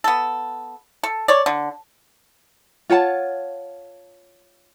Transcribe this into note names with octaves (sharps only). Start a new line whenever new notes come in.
B3 A4
A4
C#5 D5
D3
F4 C#5 F#5 A5